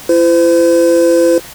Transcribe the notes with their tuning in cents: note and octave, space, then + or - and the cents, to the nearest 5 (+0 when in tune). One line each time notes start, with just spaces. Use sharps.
E4 +40 C5 -40